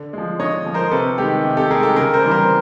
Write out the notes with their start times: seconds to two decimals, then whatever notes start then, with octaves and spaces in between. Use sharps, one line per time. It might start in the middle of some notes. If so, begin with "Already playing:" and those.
Already playing: D3
0.13 F3 G#3
0.40 D3 C#5 D#5
0.66 F3 G#3
0.74 A#4 C5
0.91 C3 A4 B4
1.18 D#3 G#3 G4 A4
1.44 C3
1.57 G4 A4
1.70 D#3 G#4 A#4
1.74 G#3
1.83 G4 A4
1.96 C#3 G#4 A#4
2.14 A#4 C5
2.22 E3 G3
2.31 A#4 C5